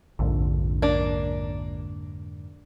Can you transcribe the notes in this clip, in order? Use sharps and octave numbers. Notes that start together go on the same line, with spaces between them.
A#1 F2 G#2 D3
A#3 D4